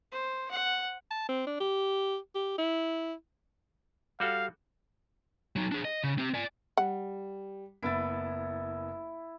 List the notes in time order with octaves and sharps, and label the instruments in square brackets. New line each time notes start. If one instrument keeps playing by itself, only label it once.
[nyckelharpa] C5
F#5
[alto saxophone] A5
C4
D4
G4
G4
E4
[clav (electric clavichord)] G3 F#4 A4 [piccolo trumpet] F5
[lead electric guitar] F#3 D#4
D4 G#4
D#5
C#3
C4 G4
D5 G#5
[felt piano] G3 [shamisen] F#5
[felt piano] F#1 B3 A6 [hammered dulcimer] E4